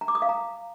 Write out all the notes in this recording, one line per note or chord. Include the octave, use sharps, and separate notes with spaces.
A#5
D6
D#6
F5
A#5